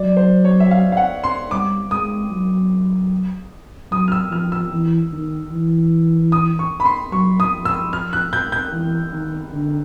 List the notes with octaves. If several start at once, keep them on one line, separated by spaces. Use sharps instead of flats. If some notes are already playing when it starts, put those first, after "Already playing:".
Already playing: F#3 D5
C5
C#5
E5
F5
F5
F#5
C6
G3 D6
G#3 D#6
F#3
F#3 D#6
F6
E6
F3 F6
E6
E3
D#3
E3
D#6
C#6
B5
C6
F#3 C#6
D#6
F3
E6
F6
F#6
G6
G6
E3
D#3
D3